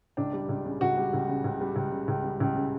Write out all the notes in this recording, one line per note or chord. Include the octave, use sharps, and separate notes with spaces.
C#2 D4
G3
C#2
C#3
C#2 F#4
G3
C#2
C#3
C#2
G3
C#2
C#3
C#2
G3
C#2
C#3